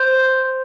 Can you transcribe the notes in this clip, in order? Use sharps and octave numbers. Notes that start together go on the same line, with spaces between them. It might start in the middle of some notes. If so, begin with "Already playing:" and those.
Already playing: C5